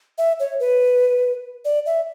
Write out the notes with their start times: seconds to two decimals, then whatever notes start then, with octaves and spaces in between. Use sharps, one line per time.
0.18 E5
0.40 C#5
0.60 B4
1.65 D5
1.86 E5